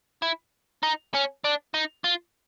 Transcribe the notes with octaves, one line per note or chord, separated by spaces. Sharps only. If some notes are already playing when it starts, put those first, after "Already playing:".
E4
D#4
C#4
D4
D#4
F4